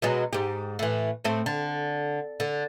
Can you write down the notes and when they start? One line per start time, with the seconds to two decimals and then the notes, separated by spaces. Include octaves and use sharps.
0.02 B2 F#3 G#3
0.33 G#2 G4
0.79 A2 E3
1.24 A2 A3 C4
1.46 D3
2.40 D3